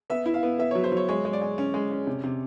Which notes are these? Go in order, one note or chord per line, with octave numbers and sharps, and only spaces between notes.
B3 E5
E4
F5
B3
B3 E5
F#3 C#5
C5
F#3 C#5
G#3 C#5
G#3
D5
G#3
C#4
G#3
C#4
C3
C3